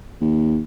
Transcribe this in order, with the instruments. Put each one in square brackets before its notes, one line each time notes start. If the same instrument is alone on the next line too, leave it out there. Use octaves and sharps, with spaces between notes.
[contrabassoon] D#2